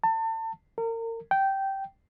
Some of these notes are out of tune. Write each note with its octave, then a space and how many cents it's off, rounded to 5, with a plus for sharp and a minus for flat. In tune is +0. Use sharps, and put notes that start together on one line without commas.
A5 +35
A#4 -35
G5 -15